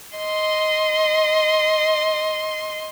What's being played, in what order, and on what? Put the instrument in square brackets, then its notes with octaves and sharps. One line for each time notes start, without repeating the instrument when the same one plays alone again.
[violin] D#5 C6